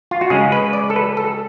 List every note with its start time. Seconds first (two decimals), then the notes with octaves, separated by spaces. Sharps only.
0.11 F4
0.21 F#4
0.30 C#3 G#3 C#4 G#4
0.52 B4
0.73 D5
0.90 A4
0.96 B4
1.17 A4